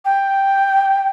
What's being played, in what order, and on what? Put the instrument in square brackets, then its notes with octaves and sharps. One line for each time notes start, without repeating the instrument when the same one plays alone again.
[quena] G5